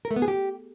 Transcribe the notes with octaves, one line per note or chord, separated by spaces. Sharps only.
A#4
A3
B3
G#4
G4